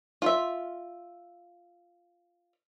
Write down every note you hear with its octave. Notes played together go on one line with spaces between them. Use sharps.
F4 E5